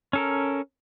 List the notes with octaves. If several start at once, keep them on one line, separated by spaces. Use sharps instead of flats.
C#4 A4 A#4